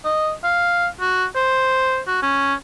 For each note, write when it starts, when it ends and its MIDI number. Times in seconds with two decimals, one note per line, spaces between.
0.05 0.32 75
0.44 0.87 77
1.01 1.25 66
1.36 1.99 72
2.08 2.22 66
2.23 2.54 61